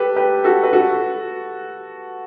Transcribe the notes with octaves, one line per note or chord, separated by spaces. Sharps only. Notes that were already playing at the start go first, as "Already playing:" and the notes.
Already playing: G4 A4 B4
G4 B4
F#4 A4
B4
F#4 A4